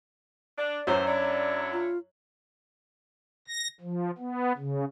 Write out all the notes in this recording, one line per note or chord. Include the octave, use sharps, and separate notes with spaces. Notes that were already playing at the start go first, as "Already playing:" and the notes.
D4 D5
F#2 A2 E3 F#3 C5
D4 E4 C#5 D5
F4
A#6
F3
B3
C#3